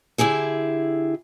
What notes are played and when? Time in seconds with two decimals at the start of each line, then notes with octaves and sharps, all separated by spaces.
0.18 D3 E4 G4 G#4 E5